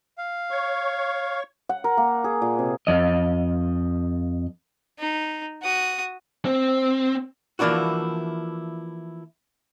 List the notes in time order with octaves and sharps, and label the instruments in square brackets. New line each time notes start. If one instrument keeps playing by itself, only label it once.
[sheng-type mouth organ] F5
[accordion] C#5 C#6
[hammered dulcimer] F#5
A#4
A#3
G#4
A#2
C3
[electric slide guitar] F2 D#5
[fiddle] D#4
F#4 D#6
[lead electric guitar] C4
[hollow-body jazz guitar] E3 F3 A#3 D4 E4 F#4